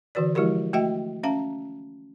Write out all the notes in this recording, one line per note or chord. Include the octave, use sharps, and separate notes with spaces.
D3 E3 F#4 B4 D5
F3 G#3 E4 F#4 G4 A#4
A3 F#4 D#5 E5 G5
C#4 E5 F5 A5 A#5